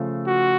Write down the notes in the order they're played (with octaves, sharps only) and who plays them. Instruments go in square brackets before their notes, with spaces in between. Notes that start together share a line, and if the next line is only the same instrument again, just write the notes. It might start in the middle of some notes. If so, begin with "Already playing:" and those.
Already playing: [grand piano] C#3 F3 A3 F4
[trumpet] F#4